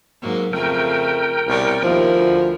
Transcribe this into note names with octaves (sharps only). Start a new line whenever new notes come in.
G#2 F#3 A#3
F2 C#3 A3 G#4 A#4 G5
C2 B2 C#5 D5
D#2 F3 E4 A#4
D2